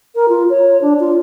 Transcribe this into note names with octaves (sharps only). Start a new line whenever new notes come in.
A#4
F4
C#5
D4
F4